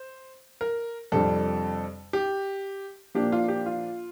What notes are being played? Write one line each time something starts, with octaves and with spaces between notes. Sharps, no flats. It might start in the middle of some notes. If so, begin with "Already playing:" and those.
Already playing: C5
A#4
F2 C3 G3 D4 A4
G4
A#2 F3 A#3 D4 G4
F4
G4
F4